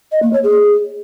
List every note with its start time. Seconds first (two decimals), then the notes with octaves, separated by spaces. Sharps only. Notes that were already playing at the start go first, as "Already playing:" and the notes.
0.12 D#5
0.22 A#3
0.33 C#5
0.44 G#4